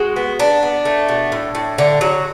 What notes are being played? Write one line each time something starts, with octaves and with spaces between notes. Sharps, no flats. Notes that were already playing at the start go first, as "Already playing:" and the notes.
Already playing: G#3 F#4
B3
B3 D4
B3
A3
B2
A2
A2
D3
F#3